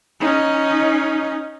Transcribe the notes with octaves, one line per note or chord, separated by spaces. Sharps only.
C#4 D#4